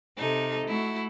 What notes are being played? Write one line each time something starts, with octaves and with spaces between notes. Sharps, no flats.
C3 D#4 A4
A3 E4 F#4